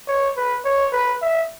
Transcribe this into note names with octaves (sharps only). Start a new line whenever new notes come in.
C#5
B4
C#5
B4
E5